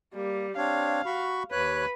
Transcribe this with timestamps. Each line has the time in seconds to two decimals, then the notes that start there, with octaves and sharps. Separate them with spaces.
0.14 G3 A#3
0.57 C4 D4 C#5 F5
1.06 F#4 B5 C#6
1.52 D#2 B4 C#5 F#6